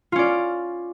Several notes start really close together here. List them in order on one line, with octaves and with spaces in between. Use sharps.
F4 C#4 D5